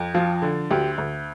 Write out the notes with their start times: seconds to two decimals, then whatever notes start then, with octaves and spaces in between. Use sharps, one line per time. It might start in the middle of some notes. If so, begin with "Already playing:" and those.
Already playing: F2
0.14 F3 F4
0.42 D3
0.71 D2 G4
0.98 D2